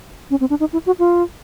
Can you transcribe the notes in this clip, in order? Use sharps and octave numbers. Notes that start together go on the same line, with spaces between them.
C#4
C4
D4
D#4
E4
F#4
F4